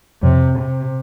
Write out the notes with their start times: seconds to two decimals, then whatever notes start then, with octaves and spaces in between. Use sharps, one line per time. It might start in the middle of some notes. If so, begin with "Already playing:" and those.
0.23 F2 C3
0.60 C3